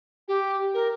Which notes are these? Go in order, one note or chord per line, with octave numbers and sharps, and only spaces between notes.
G4
A#4